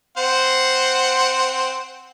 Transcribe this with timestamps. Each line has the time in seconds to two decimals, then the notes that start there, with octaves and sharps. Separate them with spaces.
0.17 C4 C5 F#5